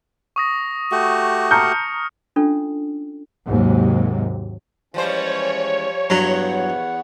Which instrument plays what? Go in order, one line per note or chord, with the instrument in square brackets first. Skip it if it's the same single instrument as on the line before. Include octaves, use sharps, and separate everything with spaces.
[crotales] C#6 D#6 A#6
[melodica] A3 F#4 G4
[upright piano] A5 A#5 G6 [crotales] D#6 F6 C#7
[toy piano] C#4 D4 F4 A4
[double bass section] D#2 G#2 C3 F#3
[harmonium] E3 G#3 C#4 [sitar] F3 G3 C5 [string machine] C#5
[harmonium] E2 B3 F#5 [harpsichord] G2 F#3